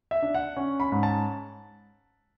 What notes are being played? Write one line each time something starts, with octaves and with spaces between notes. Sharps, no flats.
E5
D4
F#5
C#4
B5
G#2
A5